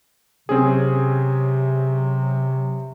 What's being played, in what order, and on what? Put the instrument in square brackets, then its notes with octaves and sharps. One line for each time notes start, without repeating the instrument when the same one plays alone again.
[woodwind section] C3 F#3 [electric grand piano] C4 C#4 G#4